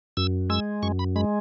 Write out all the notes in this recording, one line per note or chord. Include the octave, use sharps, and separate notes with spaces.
F#2 E6
G#3 E6
F#2 C#6
B5
G#3 B5